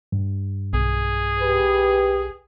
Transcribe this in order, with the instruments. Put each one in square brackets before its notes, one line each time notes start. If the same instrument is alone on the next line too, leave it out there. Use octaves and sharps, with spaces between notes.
[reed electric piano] G2
[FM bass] B1 [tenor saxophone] G#4
[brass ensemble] G4 B4